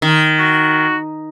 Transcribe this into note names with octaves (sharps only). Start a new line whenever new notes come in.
D#3
F#4